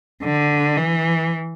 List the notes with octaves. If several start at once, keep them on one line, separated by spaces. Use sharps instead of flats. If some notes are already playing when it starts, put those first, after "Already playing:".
D3
E3